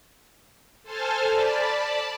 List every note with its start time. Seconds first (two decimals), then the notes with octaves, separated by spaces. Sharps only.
0.83 A4 C5 G#5 A5 F6
1.29 D5 A5 B5